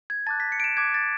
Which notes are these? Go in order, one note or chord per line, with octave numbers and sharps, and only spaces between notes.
G#6
A5 D6 F#6 A6
B6
C#7
D7
E7
A5 D6 F#6 G#6
A6